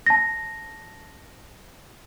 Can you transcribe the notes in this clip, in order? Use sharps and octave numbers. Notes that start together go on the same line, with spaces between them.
A5 A#6